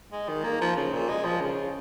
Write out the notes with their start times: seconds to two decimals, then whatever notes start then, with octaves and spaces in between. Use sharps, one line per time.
0.12 G#3
0.29 D#3
0.44 A#3
0.61 F3
0.77 C#3
0.93 A#2
1.09 G#3
1.25 F3
1.41 C#3